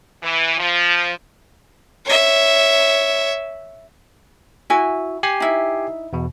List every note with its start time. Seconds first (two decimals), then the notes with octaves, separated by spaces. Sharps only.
0.23 E3
0.58 F3
2.06 C#5 E5
4.70 E4 F#4 G#5
5.23 G4 G#5 C7
5.40 D#4 E4
6.13 E2 B2